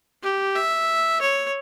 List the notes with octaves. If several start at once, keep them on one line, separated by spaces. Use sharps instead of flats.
G4
E5
C#5